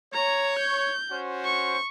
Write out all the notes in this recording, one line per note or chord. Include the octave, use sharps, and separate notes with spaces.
C#5 A#5
G6
C#4 F#4 C5
C#6